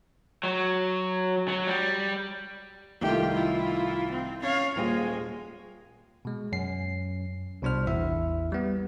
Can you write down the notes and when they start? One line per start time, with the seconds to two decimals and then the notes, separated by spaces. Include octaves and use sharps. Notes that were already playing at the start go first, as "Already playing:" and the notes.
0.43 F#3
1.48 F#3
1.67 G3
3.02 C2 D#3 A3 F4 G4
3.33 E4 F4
4.10 C4
4.42 C#4 C#5 F5 A6
4.76 D#1 D#2 G#3
6.25 B2 G#3
6.52 F#2 C#4 C7
7.62 C2 B2 D4 C5 F6
7.87 A1 E2 E4 E5
8.52 G3 B3